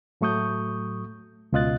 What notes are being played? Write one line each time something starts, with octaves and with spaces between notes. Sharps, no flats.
A2 F#3 A3 C#6 D#6 G6
C#2 B2 F4 D#5 F#6 A6